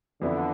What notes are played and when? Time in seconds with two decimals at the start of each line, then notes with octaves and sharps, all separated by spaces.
0.21 F2 D3 E3 B3 E4